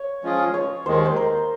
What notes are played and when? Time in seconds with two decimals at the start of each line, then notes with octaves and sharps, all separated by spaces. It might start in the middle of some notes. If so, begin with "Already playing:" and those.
Already playing: C#5
0.23 F3 G#3 C#4 F4 G#4
0.54 C#5
0.85 D#2 D#3 G#3 C5
1.05 C5
1.16 A#4